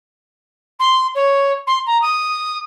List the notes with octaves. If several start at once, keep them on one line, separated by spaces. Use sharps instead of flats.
C6
C#5
C6
A#5
D#6